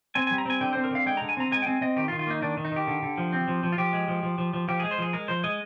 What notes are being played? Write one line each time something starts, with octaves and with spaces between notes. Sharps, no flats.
C4 G#5
G3 G#5
A#5
C4 G#5
D3 G5
C4 C5
A#4
D3 F5
G#3 G5
D3 A#5
G#5
C4 A#5
G#3 G#5
G5
C4 G#5
C4 D#5
D#3 G4
F4
D#3
F4
A#3 D#4
D#3 D4
D#3
D#4
D#3 G4
D3
D3
F3
C4
F3
F3
F4
F3 G4
G#3
F3
F3
F3
F3
F3 G4
G#3 G#4
C5
F3 G#4
G#3 A#4
F3 C5
G#3 D#5